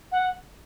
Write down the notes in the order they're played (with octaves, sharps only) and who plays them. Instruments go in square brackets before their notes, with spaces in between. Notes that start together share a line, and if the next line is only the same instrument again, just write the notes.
[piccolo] F#5